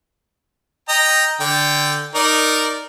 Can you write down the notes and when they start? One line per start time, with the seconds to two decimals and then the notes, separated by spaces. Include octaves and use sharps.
0.89 D#5 G5 A#5
1.40 D3 G5
2.15 D#4 A#4 D5